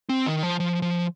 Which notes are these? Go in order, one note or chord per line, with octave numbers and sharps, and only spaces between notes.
C4
D#3
F3
F3
F3